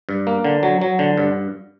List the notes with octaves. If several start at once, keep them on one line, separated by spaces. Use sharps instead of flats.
G2
A#3
D3
F#3
F#3
D3
G2